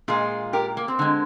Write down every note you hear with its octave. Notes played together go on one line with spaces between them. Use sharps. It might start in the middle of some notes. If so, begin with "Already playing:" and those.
A#2 G#3 F4 G#4
G4 A#4
A#3
C4
D3 G#3